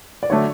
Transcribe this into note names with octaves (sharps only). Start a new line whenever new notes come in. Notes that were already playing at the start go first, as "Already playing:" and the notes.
D5
D3 F#3 A3 D4 C#5